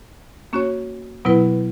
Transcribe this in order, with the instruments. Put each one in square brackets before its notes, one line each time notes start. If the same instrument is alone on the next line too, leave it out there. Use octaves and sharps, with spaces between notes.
[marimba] A#3 C#4 F#4 C#5
B2 F#3 B3 E4 B4